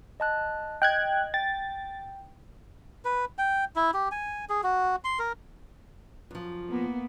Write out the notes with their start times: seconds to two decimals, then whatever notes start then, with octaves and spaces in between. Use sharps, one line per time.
0.20 D#5 A5 F#6
0.82 D#5 G5 F#6 G#6
1.34 G5 A6
3.05 B4
3.38 G5
3.76 E4
3.94 G4
4.12 G#5
4.50 G#4
4.63 F#4
5.04 C6
5.19 A#4
6.31 F#2 F3
6.71 A#3 B3